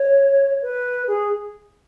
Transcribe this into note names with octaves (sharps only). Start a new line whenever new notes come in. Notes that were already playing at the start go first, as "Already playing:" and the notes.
Already playing: C#5
B4
G#4